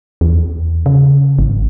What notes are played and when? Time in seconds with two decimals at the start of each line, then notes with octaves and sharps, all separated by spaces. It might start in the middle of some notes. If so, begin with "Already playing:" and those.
0.21 E2
0.86 C#3
1.39 G#1